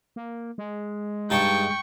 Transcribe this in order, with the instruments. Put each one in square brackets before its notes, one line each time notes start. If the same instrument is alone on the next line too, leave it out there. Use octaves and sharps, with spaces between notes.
[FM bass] A#3
G#3
[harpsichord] G2 D#4 A5 [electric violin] G5 C#6